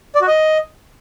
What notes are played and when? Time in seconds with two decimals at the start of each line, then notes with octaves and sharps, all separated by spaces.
0.15 D5
0.21 F#4
0.28 D#5